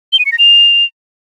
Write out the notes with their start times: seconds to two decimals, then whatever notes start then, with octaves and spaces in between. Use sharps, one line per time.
0.13 G7
0.19 D#7
0.26 C#7
0.32 A#6
0.39 F7